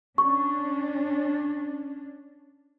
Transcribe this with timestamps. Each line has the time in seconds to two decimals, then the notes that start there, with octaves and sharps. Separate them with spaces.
0.18 C#4 D4 C#6